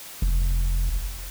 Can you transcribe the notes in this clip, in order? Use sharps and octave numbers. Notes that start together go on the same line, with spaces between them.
F1